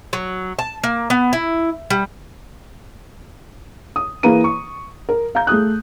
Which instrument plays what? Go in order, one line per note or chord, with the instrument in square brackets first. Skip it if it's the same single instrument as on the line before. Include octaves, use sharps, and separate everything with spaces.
[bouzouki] F#3
A5
A#3
B3
E4
G3
[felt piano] D#6
E3 A#3 G#4 B4 A#5 D#7
C#6
A#4
F5 A#5 G6
A3 G#4 D#6 F#6